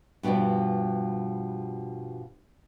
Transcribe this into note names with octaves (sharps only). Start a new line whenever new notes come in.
G2 B2 D#3 F3 G3